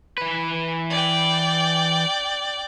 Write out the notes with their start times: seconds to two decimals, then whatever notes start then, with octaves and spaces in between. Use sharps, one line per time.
0.18 E3 B4
0.90 D5 G5